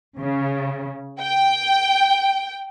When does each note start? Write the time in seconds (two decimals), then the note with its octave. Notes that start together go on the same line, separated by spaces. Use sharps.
0.19 C#3
1.20 G5